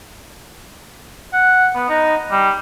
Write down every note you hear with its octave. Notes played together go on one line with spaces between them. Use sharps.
F#5
B3
D#4
G3